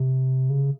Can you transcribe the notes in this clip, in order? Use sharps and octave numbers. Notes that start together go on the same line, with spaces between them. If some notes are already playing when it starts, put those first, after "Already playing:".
Already playing: C3
C#3